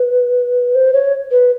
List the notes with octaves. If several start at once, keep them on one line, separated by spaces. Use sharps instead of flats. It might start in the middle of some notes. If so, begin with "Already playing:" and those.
Already playing: B4
C5
C#5
B4